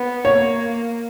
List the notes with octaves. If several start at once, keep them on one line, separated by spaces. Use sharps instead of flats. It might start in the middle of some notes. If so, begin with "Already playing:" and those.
Already playing: B3
A#3 C#5